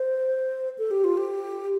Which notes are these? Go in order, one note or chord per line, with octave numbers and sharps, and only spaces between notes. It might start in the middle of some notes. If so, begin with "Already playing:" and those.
Already playing: C5
A4
G4
F4
G4